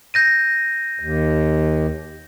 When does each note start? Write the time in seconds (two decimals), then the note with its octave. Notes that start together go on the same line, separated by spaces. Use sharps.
0.14 G6 A#6 D#7
1.00 D#2